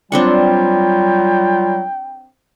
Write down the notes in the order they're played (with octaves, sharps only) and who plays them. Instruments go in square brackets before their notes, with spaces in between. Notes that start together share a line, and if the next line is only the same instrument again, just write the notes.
[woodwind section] F#3 G3 F4 [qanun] C4 D4 F#5 [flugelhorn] G5